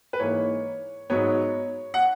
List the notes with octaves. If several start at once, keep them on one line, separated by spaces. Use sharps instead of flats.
B4
G#2 E3 A#3 C#5
G#2 F#3 B3 C#5
F#5